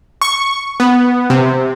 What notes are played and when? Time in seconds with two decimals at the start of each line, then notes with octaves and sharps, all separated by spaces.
0.22 C#6
0.80 B3
1.30 C3